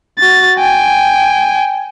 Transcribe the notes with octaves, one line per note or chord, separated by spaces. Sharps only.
F#4 A6
G5 G#5